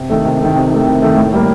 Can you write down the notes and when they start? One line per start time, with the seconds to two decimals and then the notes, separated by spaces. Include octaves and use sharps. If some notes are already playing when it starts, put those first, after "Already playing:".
Already playing: C3
0.10 D#3 A3
0.25 C3
0.39 A3
0.45 D#3
0.55 C3
0.71 D#3 A3
0.86 C3
1.02 D#3 A3
1.16 A2
1.33 G3 A#3